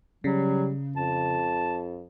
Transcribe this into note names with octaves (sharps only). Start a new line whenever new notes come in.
C#3 F#3 G3
F2 A5